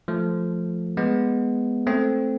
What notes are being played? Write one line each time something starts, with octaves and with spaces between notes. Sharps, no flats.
F3 A3
G#3 B3
A3 C4